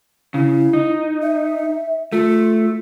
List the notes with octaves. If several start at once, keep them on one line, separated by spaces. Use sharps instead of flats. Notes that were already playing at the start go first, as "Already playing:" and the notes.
C#3 E4
D#4
E5
A3 F4